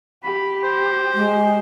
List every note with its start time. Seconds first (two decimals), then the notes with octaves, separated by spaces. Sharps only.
0.24 G4 B5
0.64 C5
1.14 G#3